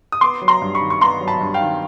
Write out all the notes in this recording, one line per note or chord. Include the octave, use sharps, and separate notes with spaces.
D#6
B3 C6 D6
F#3
A#5 C6
G2
B5 C#6
D#3
C#6
B3 A#5 C6
F#3
A5 B5
G2
F5 G5
D#3